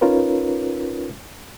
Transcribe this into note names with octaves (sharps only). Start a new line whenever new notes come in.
C#4 D#4 F4 A#4 B4 C#5